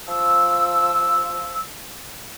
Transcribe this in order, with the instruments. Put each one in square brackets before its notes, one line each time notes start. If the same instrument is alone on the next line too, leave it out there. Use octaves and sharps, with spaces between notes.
[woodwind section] F3 E6